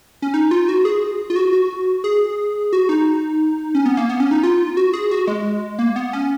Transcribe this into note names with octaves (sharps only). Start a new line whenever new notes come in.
C#4
D#4
F4
F#4
G#4
F4
F#4
F#4
G#4
F#4
D#4
C#4
B3
A#3
B3
C#4
D#4
F4
F#4
G#4
F#4
G#3
A#3
B3
C#4